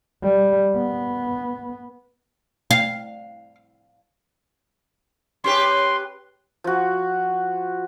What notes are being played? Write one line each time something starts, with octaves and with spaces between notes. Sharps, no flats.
G3
B3
F5
C#4 G4 B4 C6
F3 F#4